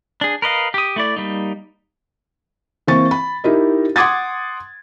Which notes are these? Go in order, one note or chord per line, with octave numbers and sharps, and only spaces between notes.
D4 G#4
A#4 B4 D#5 F5
G4 D#6
A3 E4 D5
G3 A#3 D#4
E3 A#3 C4 C#6 A6
B5
D#4 E4 G4 A#4 D#5
F#5 C6 D6 D#6 G#6 A6